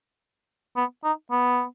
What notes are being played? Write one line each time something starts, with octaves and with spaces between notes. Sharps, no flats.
B3
D#4
B3